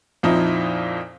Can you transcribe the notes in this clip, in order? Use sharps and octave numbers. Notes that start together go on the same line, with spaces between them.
F2 A#2 F3 C4 D#4 E4